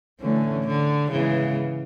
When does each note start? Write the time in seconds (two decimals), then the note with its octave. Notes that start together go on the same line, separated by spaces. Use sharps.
0.21 A2 D3 E3 A3 C#4
0.67 D3
1.12 G#2 C#3 E3 G#3 B3